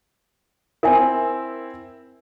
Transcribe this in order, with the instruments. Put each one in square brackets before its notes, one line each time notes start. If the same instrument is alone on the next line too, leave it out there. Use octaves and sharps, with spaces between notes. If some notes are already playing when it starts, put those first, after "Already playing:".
[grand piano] C4 E4 [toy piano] A#4 E5 G#5